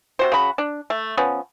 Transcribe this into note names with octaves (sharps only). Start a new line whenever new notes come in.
C3 F#4 C5
C#3 F#4 B5
D4
A3
F3 B3 C#4